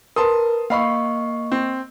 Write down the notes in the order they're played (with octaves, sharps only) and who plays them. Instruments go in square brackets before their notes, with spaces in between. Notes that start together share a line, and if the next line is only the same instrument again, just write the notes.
[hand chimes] A#4 B4 [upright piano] A5 C6 D#6
[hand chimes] A#3 D#5 C#6 [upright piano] F5 B5 C7
[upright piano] C4